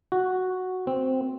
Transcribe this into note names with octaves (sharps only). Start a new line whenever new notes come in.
F#4
C4